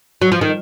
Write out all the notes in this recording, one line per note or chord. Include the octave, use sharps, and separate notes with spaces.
F#3
F3
D#3